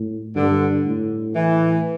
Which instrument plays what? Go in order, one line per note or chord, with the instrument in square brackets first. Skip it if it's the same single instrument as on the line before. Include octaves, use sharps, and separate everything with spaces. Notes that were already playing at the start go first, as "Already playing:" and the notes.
Already playing: [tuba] A2
[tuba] G2 [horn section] D3
[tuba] A2
[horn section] E3